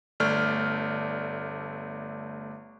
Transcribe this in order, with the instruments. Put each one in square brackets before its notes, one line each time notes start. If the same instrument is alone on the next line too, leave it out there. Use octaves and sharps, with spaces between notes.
[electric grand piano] G1 A3 D5 F6